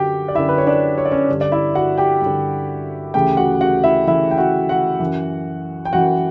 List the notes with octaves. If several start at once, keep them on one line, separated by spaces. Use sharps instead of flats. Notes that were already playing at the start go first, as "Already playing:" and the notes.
Already playing: F#2 D3 F#4 G4 G5
D5
F#2 D3 E4 E5
B4
C#5
D4 D5
C#5
D5
C#4 C#5
G2 D3
D5
E4 E5
F#4 F#5
G4 G5
G2 D3
D2 C#3 E3 G4 G5
F#4 F#5
F#4 F#5
E4 E5
D2 C#3 E3 E4 E5
G5
F#4 F#5
F#4 F#5
F#2 E3
G5
F#2 E3 F#4 F#5